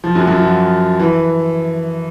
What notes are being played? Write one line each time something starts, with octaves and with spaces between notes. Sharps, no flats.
F3
F#2 F#3
F#2 F#3
F3
E3